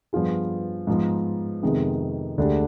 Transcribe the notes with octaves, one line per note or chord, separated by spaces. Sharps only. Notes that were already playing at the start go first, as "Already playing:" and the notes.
G2 F3 B3 F4 G#4
G#2 F3 B3 D#4
F2 C3 D#3 G#3 B3
D2 D3 G#3 D4 G4